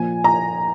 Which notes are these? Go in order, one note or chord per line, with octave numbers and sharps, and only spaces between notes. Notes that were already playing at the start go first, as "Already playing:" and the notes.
Already playing: A#2 F3 A#3 G#5
A#5